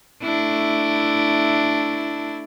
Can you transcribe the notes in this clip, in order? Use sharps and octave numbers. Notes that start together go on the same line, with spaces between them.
A3 D4 E4